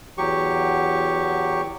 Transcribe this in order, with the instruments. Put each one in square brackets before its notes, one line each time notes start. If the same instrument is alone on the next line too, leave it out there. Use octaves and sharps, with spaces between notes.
[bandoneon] E2 F#3 G4 C#6